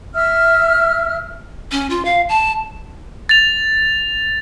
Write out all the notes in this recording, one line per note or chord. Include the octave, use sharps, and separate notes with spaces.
E5 E6 F6
C#4
F4
F5
A5
A6 F7